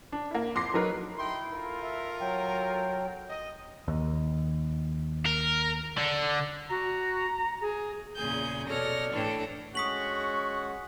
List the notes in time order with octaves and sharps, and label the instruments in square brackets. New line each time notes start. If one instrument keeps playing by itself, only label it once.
[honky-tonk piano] D4
A#3 E4
F2 C6 D6 A#6 C7
F#3 D#4 A#4 B4
[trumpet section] D#4 G5 C6 [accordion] E4
[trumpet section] F4 A4 A#4
[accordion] E5
F#3 G5
[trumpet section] D#5
[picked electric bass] D#2
[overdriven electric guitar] A#4
D3
[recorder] F#4 [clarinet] A#5
[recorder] G#4
[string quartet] E2 A#2 C#3 G#4 G#5 G6
B2 A4 C#5 D5 F6 A#6
A2 E3 D4 A4 C#5 G5
[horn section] G#3 C#4 F#4 [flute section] C#6 [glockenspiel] D#6 B6 F#7